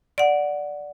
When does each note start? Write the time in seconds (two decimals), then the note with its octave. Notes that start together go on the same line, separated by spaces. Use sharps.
0.18 D5 F#5